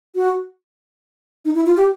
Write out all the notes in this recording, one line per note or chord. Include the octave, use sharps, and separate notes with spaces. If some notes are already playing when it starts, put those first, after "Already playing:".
F#4
D#4
E4
F4
G4